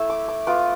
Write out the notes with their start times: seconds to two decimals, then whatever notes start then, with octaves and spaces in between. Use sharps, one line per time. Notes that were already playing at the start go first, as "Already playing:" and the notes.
Already playing: A3 E4 E6
0.10 D6
0.28 D6
0.47 B3 F4 D6